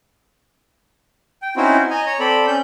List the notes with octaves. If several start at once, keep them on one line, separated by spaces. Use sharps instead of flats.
G5
C4 C#4 D#4 E4 F#4 C5
D#5 G#5 A#5
C#5 A#5
C4 A4 D5 B5
C#4 G6